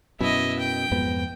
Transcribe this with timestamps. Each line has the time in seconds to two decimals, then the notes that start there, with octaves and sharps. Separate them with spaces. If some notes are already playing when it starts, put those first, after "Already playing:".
0.21 F#2 B2 E4 D#5
0.59 G5
0.91 F2 G#2 B3